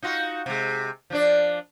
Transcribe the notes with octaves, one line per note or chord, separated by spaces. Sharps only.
D#4 F4 F#4
C3 G#3
F3 D4 D5